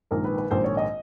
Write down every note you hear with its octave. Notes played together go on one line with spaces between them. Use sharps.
A#1 G#2 D#3 A#4
B4
B4
A#1 G#2 D#3 C5
C#5
D#5